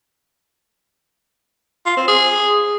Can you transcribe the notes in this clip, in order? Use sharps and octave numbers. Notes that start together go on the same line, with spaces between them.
F4
C4
G#4